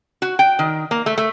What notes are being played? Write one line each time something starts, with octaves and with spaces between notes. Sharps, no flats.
F#4
G5
D#3
A#3
A3
A3